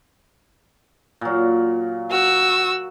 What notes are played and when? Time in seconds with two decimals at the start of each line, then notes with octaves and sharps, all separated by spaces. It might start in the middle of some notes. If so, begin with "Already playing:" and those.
1.21 A#2 F#3
2.11 F#4 E6